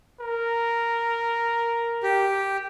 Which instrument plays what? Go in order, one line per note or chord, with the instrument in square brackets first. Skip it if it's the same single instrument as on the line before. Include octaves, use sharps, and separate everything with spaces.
[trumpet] A#4
[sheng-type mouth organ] G4